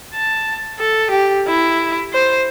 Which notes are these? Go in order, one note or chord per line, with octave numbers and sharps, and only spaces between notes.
A5
A4
G4
E4
C5